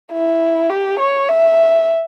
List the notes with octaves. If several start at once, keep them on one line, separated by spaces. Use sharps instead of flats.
E4
G4
C#5
E5